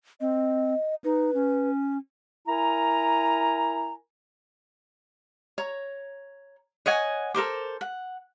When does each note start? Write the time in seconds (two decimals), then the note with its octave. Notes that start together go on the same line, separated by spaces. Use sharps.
0.21 C4 D#5
1.04 D#4 B4
1.34 C#4
2.48 E4 A#4 G#5 A#5
5.58 C#5 A#5
6.86 C#5 D#5 F#5 G#5
7.34 A4 A#4 C5 D6
7.81 F#5